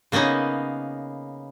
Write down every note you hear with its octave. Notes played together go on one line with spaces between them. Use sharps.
C#3 A#3 B3 C#4 D#4